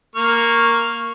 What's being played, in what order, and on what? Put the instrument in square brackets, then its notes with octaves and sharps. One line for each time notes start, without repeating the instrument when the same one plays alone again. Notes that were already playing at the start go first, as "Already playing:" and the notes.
[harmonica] A#3 C#6 F6